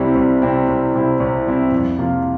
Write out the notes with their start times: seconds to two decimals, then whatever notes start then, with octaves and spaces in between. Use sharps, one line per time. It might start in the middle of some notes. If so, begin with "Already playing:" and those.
Already playing: C2 C3 G3 C4 E4
0.15 C2
0.42 C3 G3 C4 E4
0.68 C2
0.94 C3 G3 C4 E4
1.20 C2
1.46 C3 G3 C4 E4
1.72 F2
1.98 C3 F3 A#3 F4